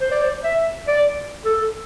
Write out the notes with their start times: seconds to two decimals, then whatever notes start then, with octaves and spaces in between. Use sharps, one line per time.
0.01 C5
0.11 D5
0.22 C5
0.44 E5
0.88 D5
1.45 A4